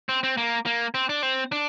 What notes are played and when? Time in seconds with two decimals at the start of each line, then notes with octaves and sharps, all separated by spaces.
0.09 C4
0.23 C4
0.37 A#3
0.66 A#3
0.94 C4
1.09 D4
1.23 C4
1.52 D4